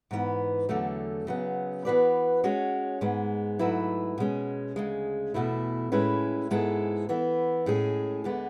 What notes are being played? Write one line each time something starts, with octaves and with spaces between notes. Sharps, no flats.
G#2 E3 B3
E2 D3 F#3 A3
C#3 F#3 B3
E3 B3 F#4 B4 D5
G#3 C#4 F#4 C#5
G#2 G#3 B3
G#2 F#3 A3 E4 B4
B2 G#3 C#4
D2 C#3 G#3
E2 B2 A3 E4
A2 G#3 C#4 E4 B4
G#2 G#3 B3 E4 A4
E3 B3 E4
A2 G#3 C#4 G#4
D2 D3 G#3 B3